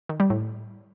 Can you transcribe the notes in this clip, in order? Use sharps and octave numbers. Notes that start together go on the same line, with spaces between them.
D#3
G3
A2